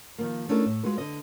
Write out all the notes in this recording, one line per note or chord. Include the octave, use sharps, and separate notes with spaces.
D#3 F3 A#3
A3 C#4 D4 E4 G#4 A#4
A2
G#3 F4 F#4 B4
D3 D#5